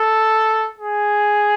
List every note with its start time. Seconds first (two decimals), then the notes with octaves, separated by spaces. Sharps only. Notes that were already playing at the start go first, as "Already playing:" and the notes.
Already playing: A4
0.78 G#4